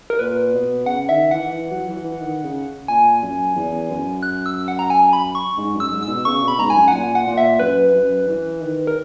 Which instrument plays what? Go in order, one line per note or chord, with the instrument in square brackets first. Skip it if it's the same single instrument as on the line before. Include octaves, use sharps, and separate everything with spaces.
[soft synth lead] A#4
[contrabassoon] A#2 [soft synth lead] B4
[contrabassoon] B2
[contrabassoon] C#3 [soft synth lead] F#5
[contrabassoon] D#3 [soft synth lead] E5
[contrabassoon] E3 [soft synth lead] F#5
[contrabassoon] E3
F#3
E3
E3
D#3
C#3
[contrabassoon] A#2 [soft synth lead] G#5
[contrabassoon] F#2
E2
F#2
[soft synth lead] F#6
E6
F#5
A#5
G#5
B5
C#6
[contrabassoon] G#2
F#2
[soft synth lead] E6
[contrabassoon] G#2
[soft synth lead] E6
[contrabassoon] B2
[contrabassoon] C#3 [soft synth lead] C#6
[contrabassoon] B2
[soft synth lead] B5
[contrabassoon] G#2 [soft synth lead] A#5
[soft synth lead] G#5
[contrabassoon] F#2
[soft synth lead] F#5
[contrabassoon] A#2 [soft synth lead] G#5
[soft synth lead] F#5
[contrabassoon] A#2
[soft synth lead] E5
[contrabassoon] F#2 [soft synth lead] B4
[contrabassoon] F#2
E3
D#3
[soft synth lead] A#4